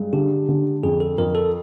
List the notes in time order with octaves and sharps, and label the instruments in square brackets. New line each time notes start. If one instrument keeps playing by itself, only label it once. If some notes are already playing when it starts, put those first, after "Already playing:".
Already playing: [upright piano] G2 G#3
[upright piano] D3 [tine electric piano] G4
[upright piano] D3
[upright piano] F2 [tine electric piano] G#4
[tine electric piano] A4
[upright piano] F2 [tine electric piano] A#4
[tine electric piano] A4